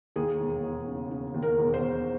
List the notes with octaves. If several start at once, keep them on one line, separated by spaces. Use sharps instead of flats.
D#2 G#4
E1
E1
C#3
C#3
D#2
A#4
E1
C5
E1